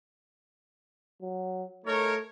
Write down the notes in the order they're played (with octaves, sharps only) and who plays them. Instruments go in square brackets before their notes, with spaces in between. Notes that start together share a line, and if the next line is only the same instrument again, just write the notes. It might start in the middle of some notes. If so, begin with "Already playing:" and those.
[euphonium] F#3
[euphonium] A3 [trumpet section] D#4 A#4 C#5